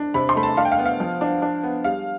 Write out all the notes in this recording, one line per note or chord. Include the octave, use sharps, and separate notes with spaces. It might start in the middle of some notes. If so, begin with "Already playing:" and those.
Already playing: D4
C3 B5
C6
A3 B5
A5
D4 F5
G5
F5
B3
F5
F3
D4
D4
B3
G3 F5